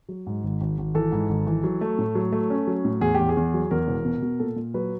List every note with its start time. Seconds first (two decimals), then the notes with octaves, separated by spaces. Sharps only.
0.09 F#3
0.27 G#2
0.43 G#1
0.61 G#1
0.78 G#1
0.95 E3 A4
1.12 G#2
1.29 G#1
1.47 E3
1.64 F#3
1.81 A3
1.99 A2
2.15 F#3
2.32 A3
2.50 C#4
2.67 F#3
2.85 A2
3.01 E2 G#4
3.15 E2 G4
3.29 G#4
3.37 E2
3.54 F#3
3.71 E2 A#4
3.88 E1
4.05 B2
4.22 B2
4.39 A#2 A4
4.56 A#2
4.74 F#3 B4